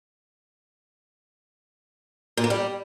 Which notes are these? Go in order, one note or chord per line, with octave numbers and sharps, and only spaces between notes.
A#2
A#3
G3